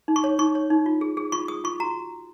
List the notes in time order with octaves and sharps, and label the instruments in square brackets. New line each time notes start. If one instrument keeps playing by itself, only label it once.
[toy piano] D#4
C#6
C#5
D#4 C#6
C#5
D#4
F4
G#4
G#4
F4 C#6
G#4 D#6
F4 C#6
F#4 A#5